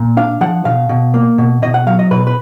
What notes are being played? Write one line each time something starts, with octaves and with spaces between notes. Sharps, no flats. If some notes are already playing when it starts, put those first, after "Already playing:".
Already playing: A#2
D4 F5
F3 F#5
B2 F5
B2
A#3
B2
B2 D#5
F#5
F#3 F5
D#5
B2 B4
B4